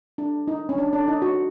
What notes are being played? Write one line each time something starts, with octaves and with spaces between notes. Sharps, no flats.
D4
D#4
C#4
D4
D4
D#4
F#4